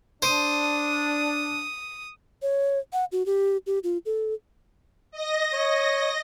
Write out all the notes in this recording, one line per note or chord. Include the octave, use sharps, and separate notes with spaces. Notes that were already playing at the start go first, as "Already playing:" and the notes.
D4 C5 D#6
C#5
F#5
F#4
G4
G4
F4
A4
D#5 A#6
C#5